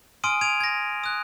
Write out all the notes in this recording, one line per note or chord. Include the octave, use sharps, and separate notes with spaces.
G#5 C6 D#6 F6 D7 D#7
G#6 D7 D#7 F7
G#6 A#6
D#6 F#6